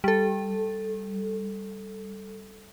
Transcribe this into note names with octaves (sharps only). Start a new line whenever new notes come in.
G3 A4